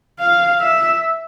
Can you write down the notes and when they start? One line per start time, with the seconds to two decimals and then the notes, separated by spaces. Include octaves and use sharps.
0.19 F5
0.60 E5